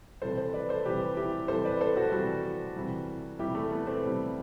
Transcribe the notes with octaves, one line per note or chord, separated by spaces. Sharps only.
C3 E3 G3 A4 C5
A4 C5
B4 D5
A4 C5
C3 E3 G3 G4 B4
E4 G4
C3 E3 G3 A4 C5
B4 D5
A4 C5
F#4 A4
C3 E3 G3 F#4 A4
C3 E3 G3
C3 E3 G3 E4 G4
A3
B3
A3 C4
C3 E3 G3